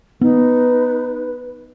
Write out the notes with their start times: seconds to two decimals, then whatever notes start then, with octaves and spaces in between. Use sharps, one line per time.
0.21 B3 D#4 B4